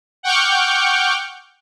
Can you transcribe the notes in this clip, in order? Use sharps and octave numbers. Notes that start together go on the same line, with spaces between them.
F#5 G5 C#6 D6 F6 G6